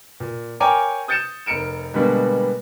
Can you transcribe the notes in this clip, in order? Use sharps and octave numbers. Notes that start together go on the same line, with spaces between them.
A#2
A#4 C#5 G5 G#5 A#5 D6
D#6 G6 A6 C#7 D#7 E7
F1 A#4 C#7 D7 E7
B2 D3 G3 G#3 A#3 B3